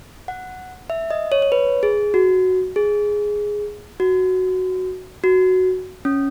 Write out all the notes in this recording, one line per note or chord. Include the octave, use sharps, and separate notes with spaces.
F#5
E5
D#5
C#5
C#5
B4
G#4
F#4
G#4
F#4
F#4
C#4